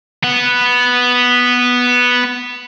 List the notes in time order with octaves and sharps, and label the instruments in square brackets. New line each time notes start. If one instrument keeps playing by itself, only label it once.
[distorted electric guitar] B3 F#5